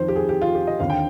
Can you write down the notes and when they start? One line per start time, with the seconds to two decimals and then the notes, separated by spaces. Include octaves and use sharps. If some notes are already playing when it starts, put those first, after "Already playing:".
Already playing: F2 D#3 C5
0.08 G4
0.16 G#4
0.29 G4
0.42 F4
0.54 G4
0.67 D#5
0.80 D#2 D3 F5
0.90 G5